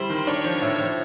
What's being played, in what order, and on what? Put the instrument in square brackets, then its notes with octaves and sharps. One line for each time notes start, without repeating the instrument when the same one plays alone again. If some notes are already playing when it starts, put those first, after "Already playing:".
Already playing: [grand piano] G3 E4 [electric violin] C5
[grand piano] D#3
[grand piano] D4 [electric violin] C#5
[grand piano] F3
A2
F3